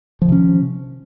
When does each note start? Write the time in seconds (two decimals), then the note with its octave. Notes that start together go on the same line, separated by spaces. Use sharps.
0.22 F3
0.25 D#3
0.29 C3
0.32 C#4